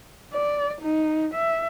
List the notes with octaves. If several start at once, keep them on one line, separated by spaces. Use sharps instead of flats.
D5
D#4
E5